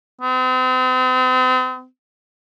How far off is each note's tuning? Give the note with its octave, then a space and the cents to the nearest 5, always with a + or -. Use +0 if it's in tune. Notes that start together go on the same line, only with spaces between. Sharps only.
C4 -40